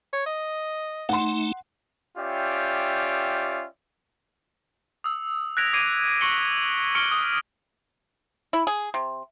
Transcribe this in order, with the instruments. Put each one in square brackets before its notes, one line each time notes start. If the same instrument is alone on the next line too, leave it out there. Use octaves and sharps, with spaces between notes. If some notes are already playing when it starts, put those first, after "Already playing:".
[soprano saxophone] C#5
D#5
[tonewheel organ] A3 D#4 [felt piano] F#5 C6
[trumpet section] C#4 F4 G4 D5 E5 G5
[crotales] D#6 E6
F#6 G#6 A#6 B6 D7 F7
D6 G#6 A#6 C7 D7 D#7
C#6 B6 C#7 F#7 G7
C#6 F6 C#7 D7 G7
D#6
[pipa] E4
G#4
C3